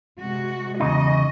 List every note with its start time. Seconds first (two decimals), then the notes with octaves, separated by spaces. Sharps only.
0.18 C3 G#3 F#4
0.80 E2 C#3 D#4 D#5